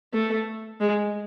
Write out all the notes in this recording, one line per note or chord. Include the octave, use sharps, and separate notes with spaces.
A3
G#3